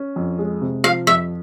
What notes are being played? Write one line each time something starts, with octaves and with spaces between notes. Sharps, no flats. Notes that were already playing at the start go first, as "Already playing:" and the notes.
Already playing: C#4
F2
G#3
C3
F3 F5
F2 E5